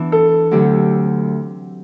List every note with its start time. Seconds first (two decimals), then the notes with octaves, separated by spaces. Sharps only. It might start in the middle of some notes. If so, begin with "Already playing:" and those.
Already playing: E3 B3 D4
0.12 A4
0.51 D2 D3 F#3 C4 G4